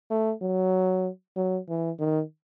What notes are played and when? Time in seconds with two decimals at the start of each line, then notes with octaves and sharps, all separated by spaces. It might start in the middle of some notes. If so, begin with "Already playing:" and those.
0.11 A3
0.42 F#3
1.36 F#3
1.69 E3
1.99 D#3